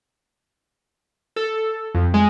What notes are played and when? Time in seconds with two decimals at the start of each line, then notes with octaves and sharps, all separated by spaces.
1.36 A4
1.95 F2
2.14 G#3